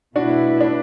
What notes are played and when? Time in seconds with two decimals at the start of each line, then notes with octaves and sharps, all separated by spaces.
0.15 B2 A3 D4 E4 F#4 B4
0.61 D4